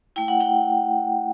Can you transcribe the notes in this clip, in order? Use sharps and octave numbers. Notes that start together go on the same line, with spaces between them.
A3 E4 G5
F#5
G5